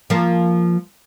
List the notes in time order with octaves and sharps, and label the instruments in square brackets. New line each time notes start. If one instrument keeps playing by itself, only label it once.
[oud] F3 A#3